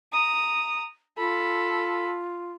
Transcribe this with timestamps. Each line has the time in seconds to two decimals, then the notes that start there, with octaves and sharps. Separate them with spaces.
0.13 A#5 D#6
1.18 F4 A4 B5